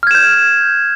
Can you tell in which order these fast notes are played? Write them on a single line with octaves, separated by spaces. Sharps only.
F6 G#6 E7 G6